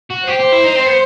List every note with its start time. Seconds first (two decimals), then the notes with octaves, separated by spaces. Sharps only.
0.10 F#4
0.27 G4 C5
0.39 G4
0.52 E4
0.64 D#4
0.76 C4
0.86 B3